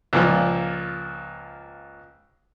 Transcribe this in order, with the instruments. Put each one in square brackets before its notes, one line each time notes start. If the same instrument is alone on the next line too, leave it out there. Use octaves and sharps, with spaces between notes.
[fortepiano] C#2 A#2 F3